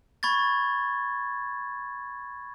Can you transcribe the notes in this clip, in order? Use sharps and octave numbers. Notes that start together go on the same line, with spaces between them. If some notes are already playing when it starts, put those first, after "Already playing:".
B5 C#6 G#6 A6